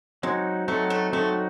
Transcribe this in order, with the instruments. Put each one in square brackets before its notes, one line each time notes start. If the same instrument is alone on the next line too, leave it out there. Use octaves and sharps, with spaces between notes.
[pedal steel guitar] F#3 C4 D#4 F#4 [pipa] G#3
[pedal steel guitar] F#3 C4 D#4 F#4 [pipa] A3
[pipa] A3
[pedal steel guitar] F#3 C4 D#4 F#4 [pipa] A3